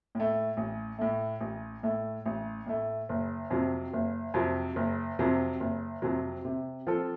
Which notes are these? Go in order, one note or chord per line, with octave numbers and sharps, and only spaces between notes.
A2 A3
A1
A2 A3
A1
A2 A3
A1
A2 A3
F#1
F2 C3 F#3
F#1
F2 C3 F#3
F#1
F2 C3 F#3
F#1
F2 C3 F#3
C3
F3 C4 F4 A4